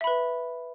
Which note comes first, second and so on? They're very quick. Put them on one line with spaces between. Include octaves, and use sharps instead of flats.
E5 B5 B4